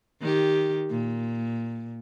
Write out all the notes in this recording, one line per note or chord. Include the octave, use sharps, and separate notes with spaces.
D#3 G4
A#2